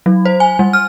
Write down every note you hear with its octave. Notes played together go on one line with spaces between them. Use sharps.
F#3
C5
G#5
G3
F6